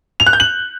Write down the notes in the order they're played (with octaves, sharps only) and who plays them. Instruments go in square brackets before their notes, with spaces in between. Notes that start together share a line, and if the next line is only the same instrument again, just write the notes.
[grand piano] F7
F#6
G6
F#7